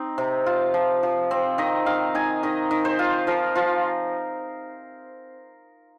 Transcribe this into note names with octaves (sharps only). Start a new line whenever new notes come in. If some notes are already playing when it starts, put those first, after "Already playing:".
Already playing: C4 D#4
C3
F4
F3
F3
C4
D#3 D#5
D#3 F5
D#4 G#5
D#3 D#5
D#3
C5
F4
F3 A#4
F3 F4